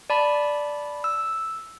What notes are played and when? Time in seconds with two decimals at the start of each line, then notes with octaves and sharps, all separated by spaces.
0.10 D5 A5 B5
1.04 E6